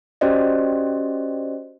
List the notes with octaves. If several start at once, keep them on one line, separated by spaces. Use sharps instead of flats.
C#4 F#4 G4 C5 D5 D#5